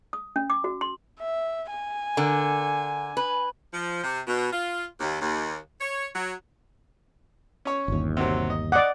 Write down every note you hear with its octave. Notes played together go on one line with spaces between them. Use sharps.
D#6
C#4
D6
F#4
C6
E5
G#5
D3 A#4
B4
F3
C3
B2
F4
D#2
D#2
C#5
F#3
C#4 C#5
G1 D#2
C3 F#3 C4
D#5
D5 D#5 F#5 D6